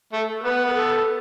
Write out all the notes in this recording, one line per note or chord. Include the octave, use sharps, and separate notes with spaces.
A3 A4
B3 B4
B4
A4